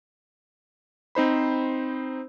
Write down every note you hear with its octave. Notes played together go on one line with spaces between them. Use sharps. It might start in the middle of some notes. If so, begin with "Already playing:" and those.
C4 D#4 C5 B5